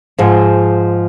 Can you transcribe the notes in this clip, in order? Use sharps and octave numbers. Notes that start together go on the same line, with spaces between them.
G#2 F3 G#3